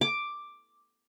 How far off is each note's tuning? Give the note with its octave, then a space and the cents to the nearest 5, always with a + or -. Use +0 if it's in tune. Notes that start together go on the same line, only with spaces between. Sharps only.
D6 +5